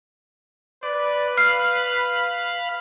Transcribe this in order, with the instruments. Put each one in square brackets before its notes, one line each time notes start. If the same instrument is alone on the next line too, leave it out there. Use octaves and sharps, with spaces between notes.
[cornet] B4 [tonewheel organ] D5
[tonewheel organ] F5 B5 [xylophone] F6 C7